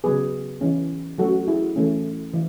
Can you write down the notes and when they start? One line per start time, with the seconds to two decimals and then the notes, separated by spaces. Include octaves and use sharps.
0.04 C#3 F#3 B3 G#4 B4
0.61 E3 G#3 C#4
1.18 F#3 A3 C#4 F#4 A4
1.48 E4 G#4
1.76 E3 A3 C#4
2.34 E3